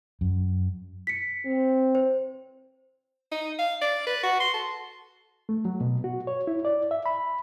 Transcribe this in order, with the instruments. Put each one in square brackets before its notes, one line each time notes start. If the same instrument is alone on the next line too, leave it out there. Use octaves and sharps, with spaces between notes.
[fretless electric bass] F#2
[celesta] B6 C#7
[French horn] C4
[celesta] C5
[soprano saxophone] D#4
F5
D5
B4
F#4
C6
A4
[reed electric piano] A3
F#3
B2
F#4
C#5
E4
D5
E5
B5